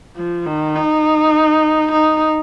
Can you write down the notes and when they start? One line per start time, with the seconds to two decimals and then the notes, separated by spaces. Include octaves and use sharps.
0.16 F3
0.46 D#3
0.76 D#4
1.92 D#4